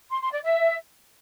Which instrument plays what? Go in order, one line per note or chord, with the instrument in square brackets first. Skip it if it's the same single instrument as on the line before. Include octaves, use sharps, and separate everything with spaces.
[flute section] C6
C6
D5
E5